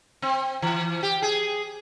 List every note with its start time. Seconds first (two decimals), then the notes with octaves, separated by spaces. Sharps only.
0.22 C4
0.62 E3
1.03 G4
1.22 G#4